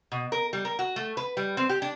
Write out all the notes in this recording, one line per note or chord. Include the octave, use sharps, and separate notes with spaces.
B2
A#4
G3
A#4
F#4
A3
B4
G3
C4
G4
D4